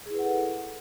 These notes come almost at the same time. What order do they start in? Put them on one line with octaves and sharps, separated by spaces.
G#4 E4 B4 F#5 A4